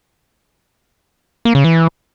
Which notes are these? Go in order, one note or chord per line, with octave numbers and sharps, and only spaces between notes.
A#3
C#3
E3